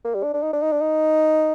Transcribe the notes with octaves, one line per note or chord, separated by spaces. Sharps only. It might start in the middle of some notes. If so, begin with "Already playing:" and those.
A#3
G3
D4
D4
D#4
D4
D#4
D4
D#4